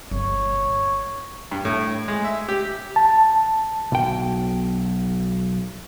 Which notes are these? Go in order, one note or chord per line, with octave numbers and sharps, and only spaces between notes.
G1 A#2 C#5
G2
A2
G#3
E5
G4
A5
B1 G5